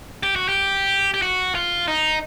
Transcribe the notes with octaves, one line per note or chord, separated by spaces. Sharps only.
G4
F#4
G4
G4
F#4
F4
D#4